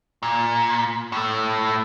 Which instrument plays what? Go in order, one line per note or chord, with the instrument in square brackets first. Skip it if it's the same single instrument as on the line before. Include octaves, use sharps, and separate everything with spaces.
[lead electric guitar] A#2
A2 A3